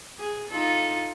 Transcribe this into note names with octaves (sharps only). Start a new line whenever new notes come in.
G#4
D#4 F4 A4